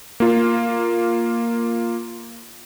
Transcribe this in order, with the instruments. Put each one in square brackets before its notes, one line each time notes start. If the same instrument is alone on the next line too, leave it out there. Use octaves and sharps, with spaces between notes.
[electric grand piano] A#3 F4